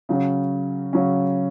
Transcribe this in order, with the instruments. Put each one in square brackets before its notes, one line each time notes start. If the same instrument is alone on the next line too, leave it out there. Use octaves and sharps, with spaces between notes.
[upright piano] C#3 F#3 C#4
C#3 F#3 C#4